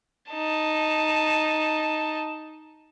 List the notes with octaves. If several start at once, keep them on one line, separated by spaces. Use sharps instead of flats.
D#4 A5